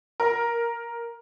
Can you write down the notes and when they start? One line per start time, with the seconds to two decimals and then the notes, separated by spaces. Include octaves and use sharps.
0.20 A#4